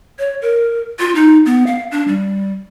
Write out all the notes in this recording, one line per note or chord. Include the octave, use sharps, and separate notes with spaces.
C#5
A#4
F4
D#4
B3
F5
D4
G3